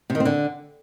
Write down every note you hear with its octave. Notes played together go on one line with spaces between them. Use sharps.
C3
D#3
C4
D3